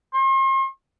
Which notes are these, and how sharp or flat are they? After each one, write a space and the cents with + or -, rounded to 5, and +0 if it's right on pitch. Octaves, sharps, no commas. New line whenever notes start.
C6 +45